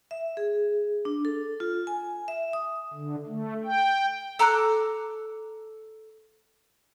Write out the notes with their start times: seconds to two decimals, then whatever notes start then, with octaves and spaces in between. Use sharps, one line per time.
0.11 E5
0.37 G#4
1.05 D4
1.25 A4
1.60 F4
1.87 G#5
2.28 E5
2.53 D#6
2.94 D3
3.27 A3
3.64 G5
4.39 A4 A#5 D6 F#6